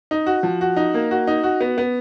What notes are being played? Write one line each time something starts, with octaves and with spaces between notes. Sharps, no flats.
D#4
F#4
F3
F#4
D#4
A#3
F#4
D#4
F#4
B3
B3